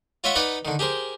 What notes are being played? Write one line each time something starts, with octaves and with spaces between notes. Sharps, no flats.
F4 C#5 D#5 E5 F#5 B5
D#4 B4 D5 F#5 A#5 B5
D3 D#3
G4 G#4 A#4 C5